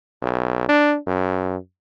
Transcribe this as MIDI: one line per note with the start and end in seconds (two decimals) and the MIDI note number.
0.22 0.66 35
0.69 0.97 62
1.07 1.57 42